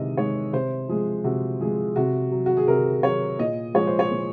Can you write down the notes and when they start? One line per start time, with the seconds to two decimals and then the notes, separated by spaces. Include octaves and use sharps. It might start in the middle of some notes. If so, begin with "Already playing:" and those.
Already playing: C3 D#3 G#3 D#5
0.17 D#3 G#3 C#5
0.53 C3 C5
0.89 F3 G#3 G#4
1.24 C3 F#4
1.61 F3 G#3 G#4
1.96 C3 F#4
2.32 F#3
2.46 F#4
2.57 G#4
2.68 C3 A#4
3.03 F#3 C#5
3.39 A#2 D#5
3.74 F3 G#3 C#5
3.87 C5
3.99 C#5
4.11 A#2